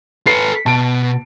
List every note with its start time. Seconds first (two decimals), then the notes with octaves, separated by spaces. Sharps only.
0.27 A4 B4 C7 C#7
0.66 B2 A5 D7